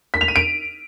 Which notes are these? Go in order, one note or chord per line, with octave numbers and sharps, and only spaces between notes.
B6
F7
D#7
D7